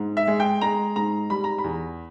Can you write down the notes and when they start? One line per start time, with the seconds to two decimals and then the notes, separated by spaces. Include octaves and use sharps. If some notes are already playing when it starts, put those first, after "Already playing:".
Already playing: G#2
0.17 E5
0.28 G#3
0.40 G5
0.61 G#3 A#5
0.96 G#2 A#5
1.30 G3 B5
1.44 A#5
1.58 B5
1.64 E2